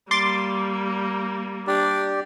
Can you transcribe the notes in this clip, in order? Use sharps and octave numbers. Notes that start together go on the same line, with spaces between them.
G3 A#3 C6 D6 A6
D4 G4 D5